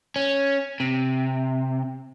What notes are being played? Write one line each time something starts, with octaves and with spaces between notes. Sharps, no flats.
C#4
C3